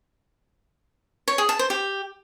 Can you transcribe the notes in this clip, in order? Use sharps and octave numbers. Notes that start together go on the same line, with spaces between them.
C#5
G#4
A5
C5
G4